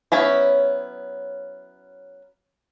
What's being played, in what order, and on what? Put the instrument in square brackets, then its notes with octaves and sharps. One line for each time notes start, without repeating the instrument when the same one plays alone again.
[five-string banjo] F#3 B3 C#4 E4